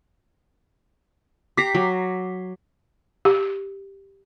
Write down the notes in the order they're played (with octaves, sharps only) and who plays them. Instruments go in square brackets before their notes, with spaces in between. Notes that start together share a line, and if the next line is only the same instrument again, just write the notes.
[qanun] G4 A#5 [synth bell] D6 B6 C7
[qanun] F#3
[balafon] G4